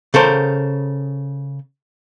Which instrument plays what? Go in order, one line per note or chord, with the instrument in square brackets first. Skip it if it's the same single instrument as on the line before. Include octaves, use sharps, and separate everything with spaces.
[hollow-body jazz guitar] C#3 A4 A#4 C5